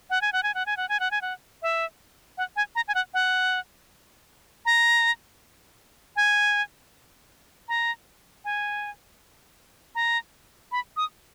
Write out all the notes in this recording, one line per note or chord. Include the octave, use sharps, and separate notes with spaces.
F#5
G#5
F#5
G#5
F#5
G#5
F#5
G#5
F#5
G#5
F#5
E5
F#5
G#5
A#5
G#5
F#5
F#5
A#5
G#5
A#5
G#5
A#5
B5
D#6